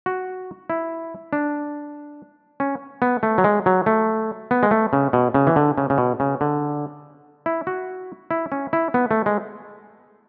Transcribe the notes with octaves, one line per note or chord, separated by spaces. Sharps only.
F#4
E4
D4
C#4
B3
A3
F#3
G#3
F#3
A3
B3
G#3
A3
C#3
B2
C#3
E3
D3
C#3
C#3
B2
C#3
D3
E4
F#4
E4
C#4
E4
B3
A3
G#3